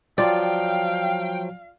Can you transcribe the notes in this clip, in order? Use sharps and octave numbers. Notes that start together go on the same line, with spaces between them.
F3 F#3 F4 D5 F5 G5